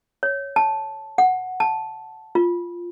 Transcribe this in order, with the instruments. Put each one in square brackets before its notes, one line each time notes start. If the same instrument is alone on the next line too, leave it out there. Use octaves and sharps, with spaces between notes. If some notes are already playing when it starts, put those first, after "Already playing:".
[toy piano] C#5
A5
F#5
A5
F4